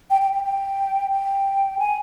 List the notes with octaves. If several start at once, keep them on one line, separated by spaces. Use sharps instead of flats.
G5
G5
G5
G5
G5
G#5